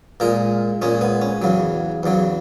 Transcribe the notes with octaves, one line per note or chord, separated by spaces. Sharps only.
A#2 G#3 A#4
A#2 G#3 C#4
B3
C#4
E2 C#3 F#3
E2 C#3 F#3